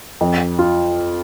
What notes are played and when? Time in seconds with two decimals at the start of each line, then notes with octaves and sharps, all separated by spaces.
0.21 F2
0.59 F4